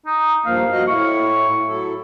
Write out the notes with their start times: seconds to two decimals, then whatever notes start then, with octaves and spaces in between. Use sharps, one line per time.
0.06 D#4
0.46 G2 F3 A#3 F5
0.72 F#4 D#5
0.87 A2 E4 C#6
1.67 F#3 E4 A4